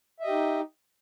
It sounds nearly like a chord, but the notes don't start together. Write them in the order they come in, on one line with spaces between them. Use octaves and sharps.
E5 D#5 G4 D#4